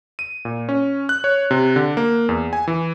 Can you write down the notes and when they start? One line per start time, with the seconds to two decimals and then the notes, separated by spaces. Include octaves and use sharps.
0.19 D#7
0.45 A#2
0.69 C#4
1.09 F#6
1.24 C#5
1.51 C3
1.76 D3
1.97 A#3
2.29 E2
2.53 G#5
2.68 E3